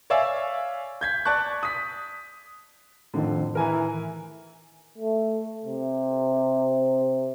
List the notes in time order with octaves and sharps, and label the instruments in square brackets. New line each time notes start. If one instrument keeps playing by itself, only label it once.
[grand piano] C#5 D5 E5 F5 G#5 E6
G6 G#6 B6
D5 A5 C#6 F#6
D#6 B6
[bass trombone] F2 [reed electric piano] A2 D#3 [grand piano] D3
[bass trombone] E3 [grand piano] A#4 G#5
[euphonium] A3
C3